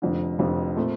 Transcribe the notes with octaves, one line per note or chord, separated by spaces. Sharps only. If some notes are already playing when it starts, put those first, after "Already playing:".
F1 F2 D3
F1 F2 D3
A#2 A3 C4